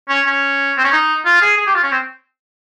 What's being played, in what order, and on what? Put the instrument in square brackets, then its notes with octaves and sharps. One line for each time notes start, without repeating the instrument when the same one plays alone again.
[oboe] C#4
C#4
C4
C#4
D#4
F4
G#4
G#4
G4
F4
C#4
C4